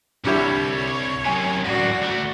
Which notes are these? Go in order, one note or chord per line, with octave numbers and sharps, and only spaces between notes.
C2 D3 G3 E4 C#5
F#2 C3 G#5
F#2 A2 F#4 D5
D2 A3